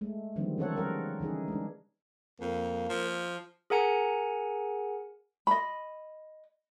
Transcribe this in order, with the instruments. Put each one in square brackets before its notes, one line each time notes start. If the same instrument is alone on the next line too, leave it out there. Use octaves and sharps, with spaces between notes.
[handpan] G#3 A3
D3 D#3 F3 G3 B3 C4
C#3 E3 C4 A4 C#5 F#5
G3 A#4 F#5
C#3 E3 D#4 G#4
G#3 D4
[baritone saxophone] F2 [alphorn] A#3
[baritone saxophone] F3
[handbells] G#4 A#4 F#5 G#5 A#5 C#7
[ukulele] D#5 B5